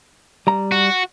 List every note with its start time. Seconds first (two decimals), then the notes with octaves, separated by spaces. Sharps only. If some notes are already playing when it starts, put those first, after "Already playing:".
0.47 G3 A#5
0.72 F#4